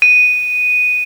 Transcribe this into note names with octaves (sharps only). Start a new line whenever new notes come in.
D#7